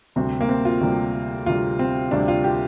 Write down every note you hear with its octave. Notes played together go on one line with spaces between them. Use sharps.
D2 C3 G3 C4
A#3
C4
F4
D2 C3 G3
D2 C3 G3 F4
C4
D2 C3 G3 D4
F4
G4